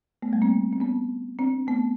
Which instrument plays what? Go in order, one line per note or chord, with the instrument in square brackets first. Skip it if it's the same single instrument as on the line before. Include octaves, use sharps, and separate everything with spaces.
[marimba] A3 B3
G3 A3
A#3 C4
C4
B3 C#4
C4 D4
A3 B3